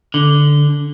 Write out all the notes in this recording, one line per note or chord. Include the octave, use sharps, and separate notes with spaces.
D3